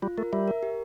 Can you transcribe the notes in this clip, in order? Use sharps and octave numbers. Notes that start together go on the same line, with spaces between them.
G3 F4
A3 A#4
G3 E5
A#4
G4